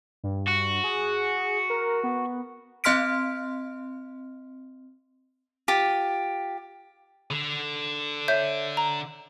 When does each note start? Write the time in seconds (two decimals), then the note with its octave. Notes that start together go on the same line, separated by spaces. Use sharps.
0.24 G2
0.47 F#4
0.84 G#4
1.70 A#4
2.04 B3
2.84 C4 D#5 C6 F6 B6 D7
5.68 F4 G4
7.31 D3
8.28 C#5 E5 G6
8.77 A#5